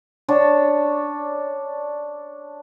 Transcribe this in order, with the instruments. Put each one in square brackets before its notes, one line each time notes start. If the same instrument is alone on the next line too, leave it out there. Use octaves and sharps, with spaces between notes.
[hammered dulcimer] D4 C#5 A5